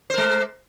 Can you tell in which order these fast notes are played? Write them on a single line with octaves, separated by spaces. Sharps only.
C5 A#4 G#3